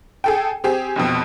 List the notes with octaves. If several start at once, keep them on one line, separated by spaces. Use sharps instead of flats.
G#4 A4 G5
C4 G4 G#4
F1 F2 B2